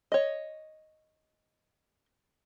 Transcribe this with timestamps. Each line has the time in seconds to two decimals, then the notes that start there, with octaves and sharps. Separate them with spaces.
0.12 C#5 D#5